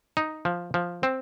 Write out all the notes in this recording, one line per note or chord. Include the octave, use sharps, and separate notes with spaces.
D#4
F3
F3
C4